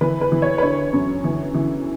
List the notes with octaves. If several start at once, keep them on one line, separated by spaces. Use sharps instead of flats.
E3 B4
B4
E3
C#5
B4
D3 C#5
F#2
E3
E3